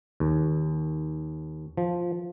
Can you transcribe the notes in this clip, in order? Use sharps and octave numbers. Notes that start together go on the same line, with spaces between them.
D#2
F3